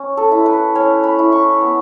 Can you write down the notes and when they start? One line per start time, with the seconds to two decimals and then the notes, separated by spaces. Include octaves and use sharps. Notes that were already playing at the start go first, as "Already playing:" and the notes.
Already playing: C#4
0.17 A4
0.31 E4
0.46 B4
0.75 C#4 C#5
1.03 B5
1.19 E4
1.32 C#6
1.61 B3